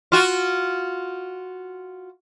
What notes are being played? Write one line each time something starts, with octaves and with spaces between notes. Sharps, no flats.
F4 F#4